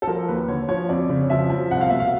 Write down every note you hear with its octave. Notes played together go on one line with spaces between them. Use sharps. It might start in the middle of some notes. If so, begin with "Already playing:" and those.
A4
F3 A#4
D#2 B4
D3 C#5
F3 C#5
F2 D5
C#3
F3 E5
F3
C2 F#5
F5
B2 E5
F5